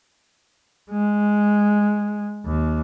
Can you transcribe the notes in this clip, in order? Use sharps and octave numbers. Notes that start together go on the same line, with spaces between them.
G#3
D#2